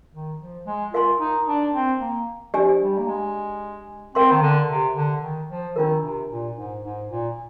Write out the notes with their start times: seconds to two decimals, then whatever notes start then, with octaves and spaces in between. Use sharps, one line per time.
0.13 D#3
0.40 F3
0.66 G#3
0.94 F4 A#4 F5 G#5 C6
1.20 D#4
1.47 D4
1.74 C4
2.01 A#3
2.54 F3 D4 G4 D5 G#5
2.80 G3
2.98 A#3
3.08 G#3
4.15 C4 A#4 F5 C6
4.32 D#3
4.42 D3
4.68 C3
4.95 D3
5.21 D#3
5.48 F3
5.75 D#3 D4 F4 A#4
6.02 C3
6.29 A#2
6.56 G#2
6.83 G#2
7.09 A#2